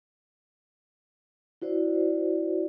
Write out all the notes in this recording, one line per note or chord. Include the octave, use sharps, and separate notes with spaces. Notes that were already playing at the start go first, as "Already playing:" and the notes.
E4 F#4 C5 D5